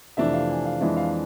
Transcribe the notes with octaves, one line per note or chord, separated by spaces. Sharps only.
F2 C3 E3 A3 D4 E5
F5
G#5
F5
F2 E3 G#3 D4 E5
F5